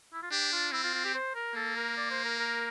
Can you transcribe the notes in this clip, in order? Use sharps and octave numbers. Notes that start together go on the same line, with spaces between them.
E4
F4
D4 G4
F4
C4 E4
F4
F4
G4
C5
A#4
A#3 A4
A#4
D5
C5
A#4
A#4